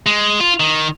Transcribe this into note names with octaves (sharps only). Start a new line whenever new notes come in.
G#3
F4
D#3